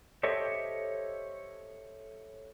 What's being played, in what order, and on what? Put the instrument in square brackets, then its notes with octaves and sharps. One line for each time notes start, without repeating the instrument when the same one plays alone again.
[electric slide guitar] G4 A4 C5 C#5 D#5 E5